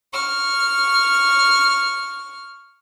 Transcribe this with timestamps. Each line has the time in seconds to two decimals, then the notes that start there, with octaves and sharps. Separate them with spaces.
0.13 C#6 F6